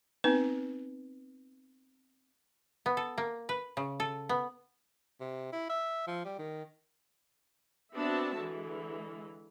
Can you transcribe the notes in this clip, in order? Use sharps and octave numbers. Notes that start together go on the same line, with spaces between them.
B3 C4 D#4 B4
B3
A4
A#3
B4
C#3
A4
B3
C3
E4
E5
F3
G3
D#3
B3 C4 D4 F#4 E5 A5
D3 E3 G#3